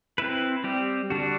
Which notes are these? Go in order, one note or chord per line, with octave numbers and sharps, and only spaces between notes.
C4 E4 B4
G3 C4 G4
D3 G3 D4 F#4